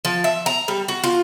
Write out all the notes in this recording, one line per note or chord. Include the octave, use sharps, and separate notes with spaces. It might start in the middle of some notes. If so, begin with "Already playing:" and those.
F3
E5
A#5
G3
F#4
F4